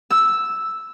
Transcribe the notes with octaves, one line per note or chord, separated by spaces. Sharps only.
E6